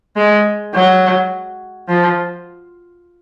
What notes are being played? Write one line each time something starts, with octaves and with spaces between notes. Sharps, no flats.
G#3
F#3
F3